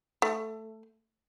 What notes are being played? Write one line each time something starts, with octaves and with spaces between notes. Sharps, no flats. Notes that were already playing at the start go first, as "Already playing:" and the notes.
A3